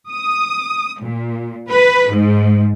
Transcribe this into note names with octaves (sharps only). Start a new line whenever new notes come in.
D#6
A#2
B4
G#2